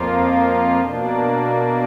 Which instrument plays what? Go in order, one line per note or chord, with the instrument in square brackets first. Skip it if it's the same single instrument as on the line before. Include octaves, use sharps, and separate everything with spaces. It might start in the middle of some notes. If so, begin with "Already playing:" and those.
Already playing: [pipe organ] F2 F3 A#3 F4
B2 A#3 D4